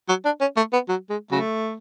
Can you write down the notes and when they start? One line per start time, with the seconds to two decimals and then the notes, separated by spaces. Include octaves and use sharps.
0.09 F#3
0.25 D4
0.41 C#4
0.57 A3
0.73 B3
0.89 F#3
1.10 G#3
1.31 C#3 F#3 A3